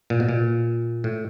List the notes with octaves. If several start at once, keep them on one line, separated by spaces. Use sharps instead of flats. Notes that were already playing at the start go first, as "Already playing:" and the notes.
A#2
B2
A#2
A2